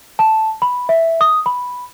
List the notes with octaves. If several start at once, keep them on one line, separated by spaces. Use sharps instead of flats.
A5
B5
E5
D#6
B5